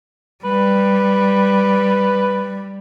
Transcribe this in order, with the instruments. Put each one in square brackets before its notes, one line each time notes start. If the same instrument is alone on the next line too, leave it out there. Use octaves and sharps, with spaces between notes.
[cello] G3 [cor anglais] B4